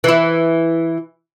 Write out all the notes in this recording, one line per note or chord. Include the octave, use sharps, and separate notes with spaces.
E3 E4